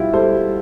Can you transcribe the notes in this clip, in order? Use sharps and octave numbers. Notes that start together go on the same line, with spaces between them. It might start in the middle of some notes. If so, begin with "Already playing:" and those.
Already playing: B2 G3 E4 F4 G4
G3 A4 C5